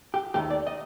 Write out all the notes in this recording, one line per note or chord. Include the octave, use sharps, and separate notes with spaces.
G4
D#2 D#3 A3 G4
D5
D#5